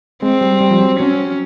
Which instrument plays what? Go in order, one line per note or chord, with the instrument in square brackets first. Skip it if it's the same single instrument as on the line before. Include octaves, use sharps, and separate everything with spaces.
[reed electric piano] G#3 [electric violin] C4
[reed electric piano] G3
G3
F3
F#3
[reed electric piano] F#3 [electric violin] C#4